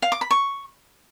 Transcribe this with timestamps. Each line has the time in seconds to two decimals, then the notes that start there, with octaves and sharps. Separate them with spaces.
0.02 F5
0.12 D6
0.21 B5
0.31 C#6